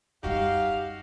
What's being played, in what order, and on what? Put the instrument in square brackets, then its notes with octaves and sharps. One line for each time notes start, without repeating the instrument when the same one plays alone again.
[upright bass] F#2 G3 [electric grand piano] D#4 F#4 [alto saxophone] G4 [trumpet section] F5